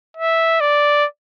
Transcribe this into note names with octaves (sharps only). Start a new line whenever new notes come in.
E5
D5